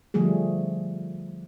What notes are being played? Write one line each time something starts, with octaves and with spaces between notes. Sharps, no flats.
D3 F3 G3 A3 G#4